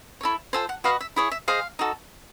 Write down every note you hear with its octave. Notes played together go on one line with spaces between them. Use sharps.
E4 A4 C#5
F4 A4 C5 G#5
F#5
F#4 B4 D#5 F5
E5
E4 G#4 C#5
E5
G#4 C5 D#5 F5
D#4 F#4 A4